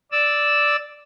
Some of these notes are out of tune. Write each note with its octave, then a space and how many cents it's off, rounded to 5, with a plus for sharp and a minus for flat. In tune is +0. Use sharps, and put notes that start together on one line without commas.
D5 +0 E6 -5